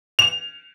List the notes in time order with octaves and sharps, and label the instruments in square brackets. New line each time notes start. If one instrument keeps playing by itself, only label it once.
[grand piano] F7